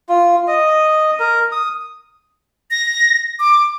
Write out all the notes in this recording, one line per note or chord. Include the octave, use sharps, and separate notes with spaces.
F4
D#5
A#4
D#6
A#6
D6